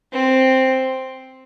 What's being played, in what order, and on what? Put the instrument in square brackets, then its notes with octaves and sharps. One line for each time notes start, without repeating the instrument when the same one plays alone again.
[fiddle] C4